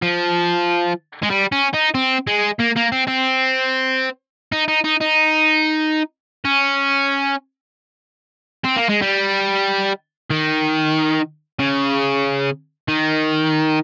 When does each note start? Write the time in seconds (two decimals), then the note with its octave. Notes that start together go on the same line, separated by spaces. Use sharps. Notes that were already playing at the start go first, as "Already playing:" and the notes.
0.02 F3
1.23 G#3
1.31 G3
1.52 C#4
1.74 D#4
1.95 C4
2.27 G#3
2.59 A#3
2.76 A#3
2.92 C4
3.08 C4
4.52 D#4
4.68 D#4
4.84 D#4
5.00 D#4
6.45 C#4
8.65 C4
8.77 A#3
8.90 G#3
9.02 G3
10.30 D#3
11.59 C#3
12.88 D#3